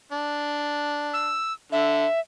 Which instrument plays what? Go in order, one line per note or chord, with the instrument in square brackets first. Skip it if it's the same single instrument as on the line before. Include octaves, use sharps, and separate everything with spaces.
[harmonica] D4
[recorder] E6
[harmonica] D3 [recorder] E5